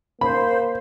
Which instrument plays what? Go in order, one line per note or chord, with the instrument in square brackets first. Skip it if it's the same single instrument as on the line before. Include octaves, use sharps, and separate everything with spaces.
[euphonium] A#3 [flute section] C5 [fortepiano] B5